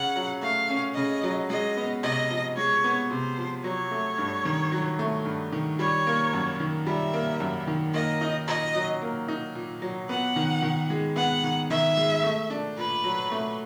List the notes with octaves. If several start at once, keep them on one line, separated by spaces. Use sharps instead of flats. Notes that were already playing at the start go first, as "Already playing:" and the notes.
Already playing: C#3 C#4 F#5
F#3
A3 F5
C#4
C#3 D#5
F#3
G#3 D#5
B3
C3 D#5
F3
G#3 C#5
B3
C3 C5
F3
F#3 C#5
A3
G2
D#3
F#3
A3
G2
D#3
G3 C#5
A#3
F#2
D#3
G3 E5
A#3
F#2
D#3
A#3 D#5
D#4
A#2 D#5
F#3
A#3
D#4
A#2
F#3
B3 F#5
D#3
D#3
G#3
B3 F#5
D#3
D#3 E5
G#3
A3
D4
A#2 B4
F#3
A3